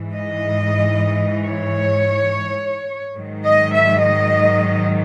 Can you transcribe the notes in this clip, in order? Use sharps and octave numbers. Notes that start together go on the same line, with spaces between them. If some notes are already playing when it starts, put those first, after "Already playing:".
Already playing: G#2 E3
D#5
C#5
G#2 D#3 F#3
D#5
E5
D#5